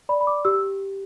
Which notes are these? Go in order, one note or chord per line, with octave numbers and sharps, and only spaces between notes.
D5 B5
B5
D6
G4 E6